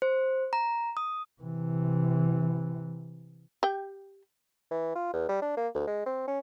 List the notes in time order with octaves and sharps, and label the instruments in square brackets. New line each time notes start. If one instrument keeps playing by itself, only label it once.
[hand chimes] C5
A#5
D#6
[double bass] C3 E3
[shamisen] G4 G5
[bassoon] E3
F4
E2
G3
D4
A#3
D2
G#3
C4
C#4